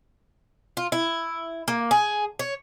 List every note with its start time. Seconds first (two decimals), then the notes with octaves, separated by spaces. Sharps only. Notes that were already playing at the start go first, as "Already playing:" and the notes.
0.77 F4
0.92 E4
1.68 A#3
1.91 G#4
2.39 C#5